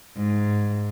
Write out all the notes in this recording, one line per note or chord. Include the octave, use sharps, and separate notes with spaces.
G#2